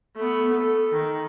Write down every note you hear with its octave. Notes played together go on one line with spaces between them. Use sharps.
A3 B3
A4
D#3